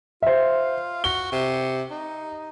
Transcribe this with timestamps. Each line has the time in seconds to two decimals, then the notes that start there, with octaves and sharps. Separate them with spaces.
0.23 F4 C5 E5
1.04 F#4 G7
1.32 C3
1.91 D#4